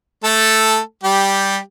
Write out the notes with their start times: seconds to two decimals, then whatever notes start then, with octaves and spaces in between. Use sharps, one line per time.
0.24 A3 A4
1.03 G3 G4